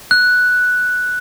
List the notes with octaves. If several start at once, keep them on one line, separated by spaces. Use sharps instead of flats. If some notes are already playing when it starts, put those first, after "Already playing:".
F#6